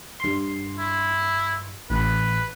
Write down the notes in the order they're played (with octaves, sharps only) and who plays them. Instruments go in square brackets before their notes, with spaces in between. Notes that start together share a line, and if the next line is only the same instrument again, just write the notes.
[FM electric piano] G2 C6
[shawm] E4
[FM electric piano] A1 [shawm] B4